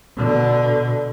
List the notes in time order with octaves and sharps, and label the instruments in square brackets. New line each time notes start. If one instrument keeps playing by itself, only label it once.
[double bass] B2 D3